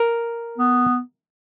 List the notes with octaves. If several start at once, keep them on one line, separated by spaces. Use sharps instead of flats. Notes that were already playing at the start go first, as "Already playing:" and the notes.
Already playing: A#4
B3